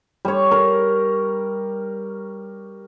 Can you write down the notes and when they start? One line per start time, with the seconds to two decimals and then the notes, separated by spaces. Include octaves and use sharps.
0.25 G3 C#5
0.51 A#4